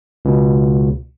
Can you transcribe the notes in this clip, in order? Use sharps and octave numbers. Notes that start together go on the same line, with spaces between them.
C#2 B2